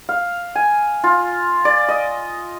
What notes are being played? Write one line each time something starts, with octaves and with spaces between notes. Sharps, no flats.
F5
G#5
F4
D5
D#5